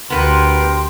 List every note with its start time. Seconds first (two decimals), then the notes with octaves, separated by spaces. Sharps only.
0.10 D2 B3 G4 A#4 B4 C6